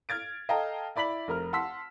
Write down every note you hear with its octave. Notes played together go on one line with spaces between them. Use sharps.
F6 G#6 A6 D7
A4 D#5 F5 G5 A5 A#5
E4 D5 B5 B6 F#7
F1 A#4 F6
F#5 A5 C6 E6 B6